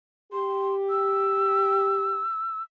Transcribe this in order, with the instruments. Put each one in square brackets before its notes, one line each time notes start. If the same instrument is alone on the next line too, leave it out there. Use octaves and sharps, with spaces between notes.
[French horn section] G4 [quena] C6
[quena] E6